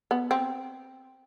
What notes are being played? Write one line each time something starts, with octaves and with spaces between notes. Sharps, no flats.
B3
C4